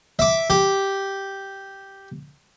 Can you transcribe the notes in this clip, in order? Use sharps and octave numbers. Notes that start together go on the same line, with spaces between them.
E5 D6
G4